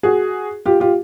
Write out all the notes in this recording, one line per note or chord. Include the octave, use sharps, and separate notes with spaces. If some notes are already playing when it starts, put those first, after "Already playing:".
F#4 G#4
F4 G4
F4 G4